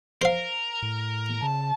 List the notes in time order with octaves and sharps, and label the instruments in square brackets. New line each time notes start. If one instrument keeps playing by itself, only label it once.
[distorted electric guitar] A#4 [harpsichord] C5 F5
[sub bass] A2
[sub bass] C#3 [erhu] A5